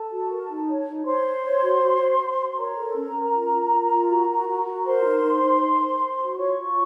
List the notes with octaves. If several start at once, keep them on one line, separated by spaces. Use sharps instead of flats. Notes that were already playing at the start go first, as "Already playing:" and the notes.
Already playing: A4 A5
F#4
A#4
D#4
C#5
D#4
C5 C#5 C6
C#5
C#5
F#4
F#4
F#4
C5
F#4
A#4 C#5 A#5
A4
C#4
C#4
F4
F4
F4
F4
F#4
F#4
F#4
F#4
A#4 C5 C6
D#4
D#4
D#4
C5
C5
C5
F#4
C6
F4 C#5 C#6
F4